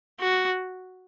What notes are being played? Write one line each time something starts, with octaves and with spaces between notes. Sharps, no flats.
F#4